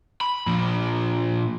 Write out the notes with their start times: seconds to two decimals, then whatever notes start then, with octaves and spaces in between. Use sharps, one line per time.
0.21 B5
0.47 A#2 F3